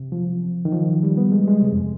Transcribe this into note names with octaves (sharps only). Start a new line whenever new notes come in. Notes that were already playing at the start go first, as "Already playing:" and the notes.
Already playing: C3
F3
D#3
F3
G3
B3
G#3
G3
G#3
C3
F2